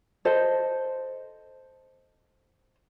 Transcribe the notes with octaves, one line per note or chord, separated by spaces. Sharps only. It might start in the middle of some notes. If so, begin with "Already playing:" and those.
A4 C5 D#5